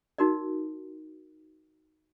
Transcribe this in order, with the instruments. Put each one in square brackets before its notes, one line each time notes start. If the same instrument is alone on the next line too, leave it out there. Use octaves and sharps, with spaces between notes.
[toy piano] D#4 F#4 A#4 D5